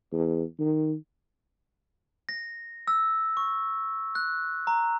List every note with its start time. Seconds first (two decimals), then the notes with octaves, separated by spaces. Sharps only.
0.12 E2
0.59 D#3
2.29 A#6
2.88 E6
3.37 C#6
4.15 F#6
4.67 A#5